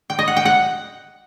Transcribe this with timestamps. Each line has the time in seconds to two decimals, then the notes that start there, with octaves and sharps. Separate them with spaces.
0.10 G5
0.19 D#5
0.28 F#5
0.37 G5
0.45 F#5